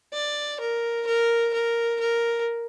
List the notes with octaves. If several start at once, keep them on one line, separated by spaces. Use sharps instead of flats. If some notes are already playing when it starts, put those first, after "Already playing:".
D5
A#4
A#4
A#4
A#4